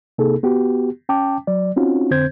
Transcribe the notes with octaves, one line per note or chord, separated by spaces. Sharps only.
C3 A#3 D#4 G#4 A4
B3 F#4 G4
C#4 G5 A5 D6
F#3 D5
C4 C#4 D#4 F4 F#4
F2 D3 C4 C5 G6 G#6